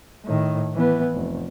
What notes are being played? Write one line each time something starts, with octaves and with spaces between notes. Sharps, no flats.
A2 D#3
E3 B3
F1